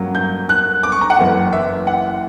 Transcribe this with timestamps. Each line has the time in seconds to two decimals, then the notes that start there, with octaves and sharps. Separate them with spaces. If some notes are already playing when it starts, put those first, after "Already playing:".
Already playing: G2 F#3 A#3 C#4
0.15 G6
0.49 F#6
0.83 D6
0.92 C#6
1.01 A#5
1.10 F#5
1.18 F#1 F#2 E3
1.53 E5
1.87 F#5